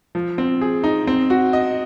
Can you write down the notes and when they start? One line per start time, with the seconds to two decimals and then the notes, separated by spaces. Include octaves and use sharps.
0.15 F3
0.38 C4
0.61 G#4
0.84 D#4
1.07 C4
1.30 F#4
1.53 D#5